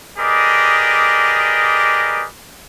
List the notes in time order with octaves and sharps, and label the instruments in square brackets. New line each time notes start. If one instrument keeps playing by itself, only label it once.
[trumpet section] G4 G#4 A#4 B4 D5 D#5